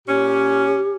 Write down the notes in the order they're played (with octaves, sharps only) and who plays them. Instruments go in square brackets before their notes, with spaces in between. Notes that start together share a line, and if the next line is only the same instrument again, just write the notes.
[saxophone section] A#2 C#4 [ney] G4